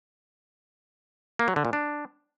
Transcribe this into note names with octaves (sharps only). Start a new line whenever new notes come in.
A#3
F#3
D3
A#2
D4